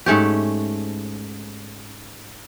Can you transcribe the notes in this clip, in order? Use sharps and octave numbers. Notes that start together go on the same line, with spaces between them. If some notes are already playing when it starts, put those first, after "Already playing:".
G#2 A3 C#4 G4